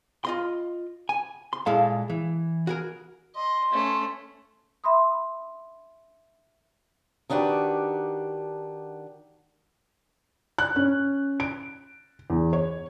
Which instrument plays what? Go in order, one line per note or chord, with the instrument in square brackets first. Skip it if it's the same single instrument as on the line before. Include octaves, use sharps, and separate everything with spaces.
[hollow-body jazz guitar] F4 D#5 C6
G#5
C6
A#2 G#3 E4 A4 F5 A5
E3
F#4 G#4 A#4
[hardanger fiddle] D#5 [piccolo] C6
[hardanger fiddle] A3 C#4
[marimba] E5 B5 C6 D#6
[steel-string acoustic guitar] D#3 D4 F#4 G4 B4
[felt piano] F#6
C#4
D7
E2
C#5